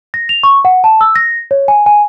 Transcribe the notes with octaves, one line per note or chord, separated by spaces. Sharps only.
A#6
F7
C#6
F#5
A5
E6
A#6
C#5
G#5
G#5